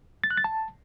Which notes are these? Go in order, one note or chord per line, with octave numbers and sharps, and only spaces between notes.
A6
F#6
A6
A5